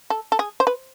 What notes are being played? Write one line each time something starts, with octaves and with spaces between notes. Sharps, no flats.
A4
A4
G#4
C5
B4